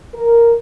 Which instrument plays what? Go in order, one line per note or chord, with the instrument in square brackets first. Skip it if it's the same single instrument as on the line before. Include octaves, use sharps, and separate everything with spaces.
[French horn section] A#4